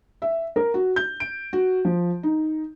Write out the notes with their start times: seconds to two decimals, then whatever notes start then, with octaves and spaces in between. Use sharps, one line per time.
0.22 E5
0.56 A#4
0.74 F#4
0.96 G6
1.20 D7
1.53 F#4
1.85 F3
2.23 D#4